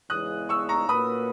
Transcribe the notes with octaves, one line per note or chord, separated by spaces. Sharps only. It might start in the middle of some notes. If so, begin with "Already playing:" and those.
E2 C#3 G#3 D#6 F#6
C#6 E6
A#5 C#6
A#2 A#3 C#4 F#4 B4 B5 D#6